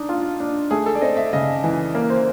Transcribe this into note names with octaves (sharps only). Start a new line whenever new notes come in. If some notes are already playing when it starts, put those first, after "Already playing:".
Already playing: D4 D#4
F4
D4
A3 G#4
A4
D5
C4 D#5
E5
C#3 D#5
E3
A#3
C5